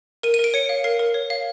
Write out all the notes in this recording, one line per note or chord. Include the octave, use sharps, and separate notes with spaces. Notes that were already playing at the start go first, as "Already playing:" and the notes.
A#4 D#7
D#7
A#4 D7
C#5 C#7
F5
A#4 C7
A#4
C#5
F5